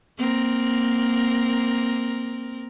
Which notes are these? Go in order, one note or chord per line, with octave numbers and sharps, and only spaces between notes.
A#3 C4 A#4